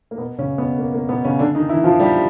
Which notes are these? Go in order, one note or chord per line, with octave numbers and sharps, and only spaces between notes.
A#3
B2 B3
C#3 C#4
B2 B3
A#3
A#3
B2 B3
C#3 C#4
D3 D4
D#3 D#4
E3 E4
F3 F4
G3 G4